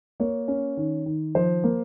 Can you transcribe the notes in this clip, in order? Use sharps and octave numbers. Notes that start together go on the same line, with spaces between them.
A#3 C#5
C#4
D#3
D#3
F3 C5
A#3